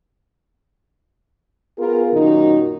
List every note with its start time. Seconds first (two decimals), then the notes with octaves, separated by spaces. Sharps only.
1.78 B3 F4 G#4 A#4
2.13 F#2 A#2 D#3 F#3 D#4